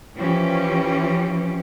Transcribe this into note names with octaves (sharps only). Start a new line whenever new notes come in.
E3 F3 C#4 G4